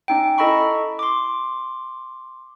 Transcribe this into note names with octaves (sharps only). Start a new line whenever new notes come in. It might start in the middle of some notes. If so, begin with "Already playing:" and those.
C#4 D#4 G5
E4 A4 D#5 A#5 B5 C#6
C6 D6